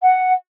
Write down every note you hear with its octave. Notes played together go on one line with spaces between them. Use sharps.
F#5